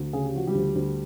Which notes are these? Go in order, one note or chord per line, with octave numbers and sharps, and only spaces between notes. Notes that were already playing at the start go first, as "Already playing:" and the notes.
Already playing: D2
C#3 G#4
G4
F3 F#4
G3 G4
D2
D2